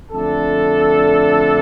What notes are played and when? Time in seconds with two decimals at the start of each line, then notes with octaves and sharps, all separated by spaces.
0.11 F2 D3 A3 D4 A4